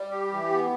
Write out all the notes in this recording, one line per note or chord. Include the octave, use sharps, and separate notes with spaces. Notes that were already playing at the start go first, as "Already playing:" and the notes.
Already playing: G3
G4
E3
B3